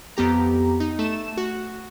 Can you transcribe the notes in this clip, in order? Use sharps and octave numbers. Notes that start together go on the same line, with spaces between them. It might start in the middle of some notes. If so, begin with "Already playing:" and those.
F2 B3 G4 A#5
D#4
A3 E7
F#4